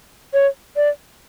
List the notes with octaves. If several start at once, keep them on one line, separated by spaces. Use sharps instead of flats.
C#5
D5